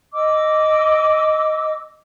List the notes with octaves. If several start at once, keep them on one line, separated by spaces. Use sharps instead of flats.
D#5 D6 E6